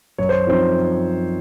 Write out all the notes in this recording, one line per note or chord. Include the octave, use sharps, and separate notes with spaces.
F#2 C#5
C5
F3 C4 D#4 C5